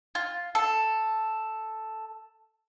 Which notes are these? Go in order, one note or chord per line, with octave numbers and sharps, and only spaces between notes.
F4
A4